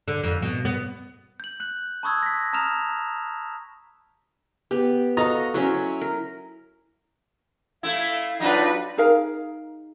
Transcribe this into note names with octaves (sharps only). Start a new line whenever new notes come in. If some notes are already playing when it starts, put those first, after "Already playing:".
D3
F2
B2
B3
G6 F#7
F#6 F#7
A5 B5 C#6 D#6 E6 G#6
A#6 B6
A5 A#5 D#6 F6 E7 F7
B3 G4
F#4 A4 D#5 F5 A#5
F#3 C#4 E4 E5 C6
A#4
A3 E4 F5
F#3 D4 D#4 F4 B4
D#4 G#4 A#4 F5